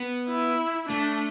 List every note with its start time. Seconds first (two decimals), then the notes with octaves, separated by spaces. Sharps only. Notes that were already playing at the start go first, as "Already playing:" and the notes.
Already playing: B3
0.29 E4
0.89 A3 D4